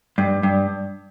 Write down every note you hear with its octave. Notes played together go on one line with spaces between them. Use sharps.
G2
G2